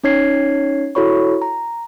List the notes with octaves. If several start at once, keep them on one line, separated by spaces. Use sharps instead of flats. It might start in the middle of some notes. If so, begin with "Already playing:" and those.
C#4 D#4 C#5 G#6 C7
E4 F#4 A4 C#5 B5 C#6
A#5